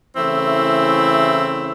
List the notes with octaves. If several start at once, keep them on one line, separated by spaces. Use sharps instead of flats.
C#3 E3 A3 C4 E4